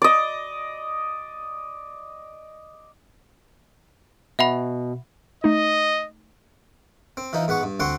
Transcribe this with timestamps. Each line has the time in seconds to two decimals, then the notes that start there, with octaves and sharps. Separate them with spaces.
0.02 D5 D#5
4.39 B2 E5 F#5 B5
5.44 A3 D#4 D#5
7.17 C4
7.33 E3 F3 D#4
7.48 G#2 B3 F#5 C#6
7.63 G2
7.80 D2 C4 F#5 C6 C#6